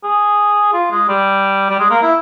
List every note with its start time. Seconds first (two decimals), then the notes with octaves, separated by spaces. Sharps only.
0.04 G#4
0.74 F4
0.91 G#3
1.09 G3
1.70 G3
1.79 G#3
1.91 A#3
2.03 E4